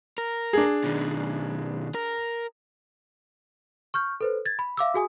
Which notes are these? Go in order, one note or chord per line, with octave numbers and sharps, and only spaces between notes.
A#4
D4 G#4
B2 D#3
A#4
C#6 F6 G6
A4 B4 C5
G#6 A6
B5
E5 F5 D6 E6
F#4 G#4 G#5 D#6